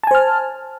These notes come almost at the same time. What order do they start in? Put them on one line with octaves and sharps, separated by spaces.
A5 G#5 C5 F6